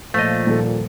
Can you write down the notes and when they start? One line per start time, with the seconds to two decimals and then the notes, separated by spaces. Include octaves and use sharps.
0.14 A#2 F3 A3 D#5
0.47 D#1 A4